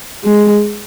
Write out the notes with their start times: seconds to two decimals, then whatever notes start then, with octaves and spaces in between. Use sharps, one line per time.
0.24 G#3